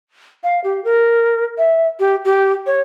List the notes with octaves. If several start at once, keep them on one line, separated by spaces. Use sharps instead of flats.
F5
G4
A#4
E5
G4
G4
C#5